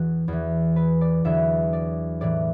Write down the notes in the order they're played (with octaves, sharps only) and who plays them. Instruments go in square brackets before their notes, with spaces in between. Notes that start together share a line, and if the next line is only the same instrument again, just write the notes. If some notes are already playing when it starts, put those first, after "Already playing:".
Already playing: [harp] E2 E3 F#4
E2 E3
B4
D5
E2 D3 F#3 E5
D5
A2 E3 D5